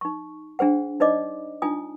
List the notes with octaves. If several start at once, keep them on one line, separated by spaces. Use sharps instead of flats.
D#4 C#6
D4 G#4 C5 F#5
D#4 C5 D5 D#5 D6
D4 D#4 F4 G#5 D#6